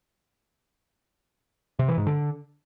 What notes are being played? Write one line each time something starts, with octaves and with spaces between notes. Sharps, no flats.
C3
E3
G#2
D3